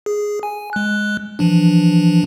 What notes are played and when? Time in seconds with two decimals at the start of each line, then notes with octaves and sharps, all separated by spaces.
0.06 G#4
0.43 G#5
0.73 G#3 F#6
1.39 E3 F3 D4